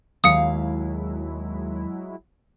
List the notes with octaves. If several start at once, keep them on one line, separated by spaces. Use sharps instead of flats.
D#2 F#3 G#3 E4 F5 D#6 C#7